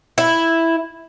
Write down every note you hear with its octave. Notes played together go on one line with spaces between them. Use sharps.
E4